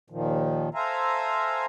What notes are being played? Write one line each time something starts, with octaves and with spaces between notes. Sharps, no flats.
D#2 A#2 D#3 F3
A4 C5 E5 F5 G#5 A#5